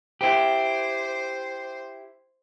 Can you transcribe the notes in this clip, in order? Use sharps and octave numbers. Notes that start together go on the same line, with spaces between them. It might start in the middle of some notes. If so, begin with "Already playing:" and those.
E4 G4 C5